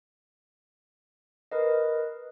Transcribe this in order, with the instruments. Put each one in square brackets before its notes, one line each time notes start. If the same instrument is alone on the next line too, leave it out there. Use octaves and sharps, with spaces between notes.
[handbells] A#4 B4 D#5